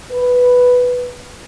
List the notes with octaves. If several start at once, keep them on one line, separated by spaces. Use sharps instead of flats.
B4